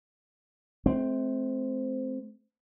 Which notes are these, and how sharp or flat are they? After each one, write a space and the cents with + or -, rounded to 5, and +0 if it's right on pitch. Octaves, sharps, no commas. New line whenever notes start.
A3 -40 C4 -5